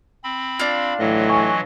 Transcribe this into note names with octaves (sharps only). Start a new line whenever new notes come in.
C4 B5
D4 F4
A2 E3 F#3 D#5
G#5 C#6